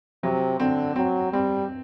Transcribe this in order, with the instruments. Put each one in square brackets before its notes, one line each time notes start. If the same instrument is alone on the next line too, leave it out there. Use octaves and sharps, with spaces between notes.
[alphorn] C3 [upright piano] F#3
[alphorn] D3 [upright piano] C4
[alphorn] F#3 [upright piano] C4
[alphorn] G3 [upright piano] C4